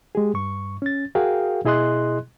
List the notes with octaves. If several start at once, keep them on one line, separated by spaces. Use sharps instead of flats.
G#3 G4 G#4
G2 C#6
C#4 A6
F#4 G#4 A#4 F5 G5
B2 E4 G#4 D#5 C6 F#6